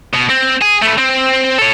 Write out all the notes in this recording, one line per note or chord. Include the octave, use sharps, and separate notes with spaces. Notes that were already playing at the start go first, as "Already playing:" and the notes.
B2
C4
G#4
A3 B4
C4
A4 C#5